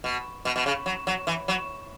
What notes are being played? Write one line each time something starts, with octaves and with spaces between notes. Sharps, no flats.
B2
B2
B2
C#3
F#3
F#3
E3
F#3